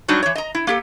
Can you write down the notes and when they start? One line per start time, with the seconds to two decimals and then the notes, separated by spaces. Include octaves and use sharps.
0.08 F#3 G3 D4 D#4 F#4
0.23 E3 C#5
0.35 D#5 A#5
0.55 E4
0.67 A#3 G4 A4